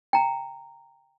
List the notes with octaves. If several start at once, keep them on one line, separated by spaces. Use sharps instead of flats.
G5 A#5